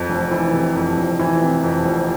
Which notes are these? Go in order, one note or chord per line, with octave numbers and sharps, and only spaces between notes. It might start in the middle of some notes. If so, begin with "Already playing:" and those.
Already playing: F2
F1
E3
C3
F2
F1
E3
C3
F2
F1